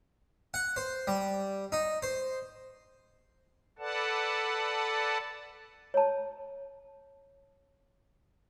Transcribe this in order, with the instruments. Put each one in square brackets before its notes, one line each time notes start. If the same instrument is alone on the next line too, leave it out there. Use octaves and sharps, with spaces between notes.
[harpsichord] F#5
C5
G3
D#4
C5
[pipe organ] A4 B4 D5 F#5 A5
[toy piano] C#5 A5